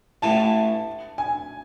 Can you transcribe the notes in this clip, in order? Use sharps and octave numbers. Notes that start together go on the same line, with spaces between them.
A1 A2 E3 A5
G#5